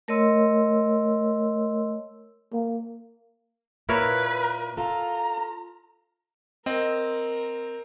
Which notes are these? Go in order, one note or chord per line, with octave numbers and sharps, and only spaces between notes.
A3 A#4 C#5 D#5 C6 E6
A#3
A#2 E4 A#4 B4 C#5
F4 A4 A#5
C4 A#4 D#5